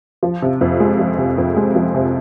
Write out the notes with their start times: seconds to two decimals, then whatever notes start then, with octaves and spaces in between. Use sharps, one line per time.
0.23 F3
0.42 C3
0.61 F2
0.80 G#3
0.99 F3
1.18 C3
1.38 F2
1.56 G#3
1.75 F3
1.95 C3